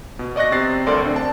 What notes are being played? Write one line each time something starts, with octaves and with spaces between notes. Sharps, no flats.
B2
D5 D#5 C#6 F#6 A#6
C3 C4 A6 C7
G1 D2 A4 A#4 D5 C6
C4 D4 D5
A5